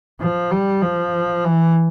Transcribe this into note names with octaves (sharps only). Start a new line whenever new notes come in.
F3
G3
F3
E3